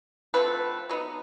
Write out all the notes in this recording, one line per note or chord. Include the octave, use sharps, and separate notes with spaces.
D3 F3 A3 C4 B4
F#3 B3 D#4